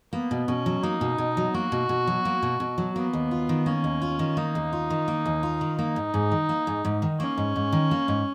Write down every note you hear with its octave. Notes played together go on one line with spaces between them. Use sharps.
A#3 B3
B2
B2 C#4
F#3
A#3 D#4
B2
B2
F#3
A#3 F#4
B2
B2
F#3
A#3
B2
B2
F#3
A#3 B3
D#2
F4
D#3
A#3 C#4
D#2
F4
D#3
A#3 D#4
D#2
F4
D#3
A#3
D#2
F4
D#3
A#3 D#4
G#2
G#2
D#3
A#3
G#2
G#2
D#3
A#3 C#4
G#2
G#2
D#3
A#3
G#2